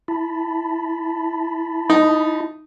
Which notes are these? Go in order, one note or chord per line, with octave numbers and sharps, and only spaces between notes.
E4 A5 B5
D#4